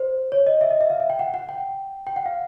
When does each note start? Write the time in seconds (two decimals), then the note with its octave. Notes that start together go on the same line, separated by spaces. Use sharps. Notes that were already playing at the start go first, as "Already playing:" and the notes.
Already playing: C5
0.32 C#5
0.47 D#5
0.61 E5
0.71 D#5
0.81 E5
0.90 F5
1.00 E5
1.10 G5
1.19 F#5
1.34 F#5
1.49 G5
2.07 G5
2.16 F#5
2.26 F5